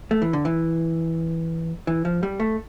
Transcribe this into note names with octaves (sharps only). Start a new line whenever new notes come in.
A3
E3
D3
E3
E3
F3
G3
A3